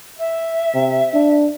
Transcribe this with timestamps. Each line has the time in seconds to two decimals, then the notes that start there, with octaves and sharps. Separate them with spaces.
0.17 E5
0.75 C3
1.14 D4